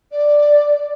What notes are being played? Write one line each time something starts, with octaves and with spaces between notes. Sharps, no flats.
D5